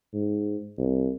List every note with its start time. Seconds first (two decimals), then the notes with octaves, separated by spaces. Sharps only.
0.13 G#2
0.78 C2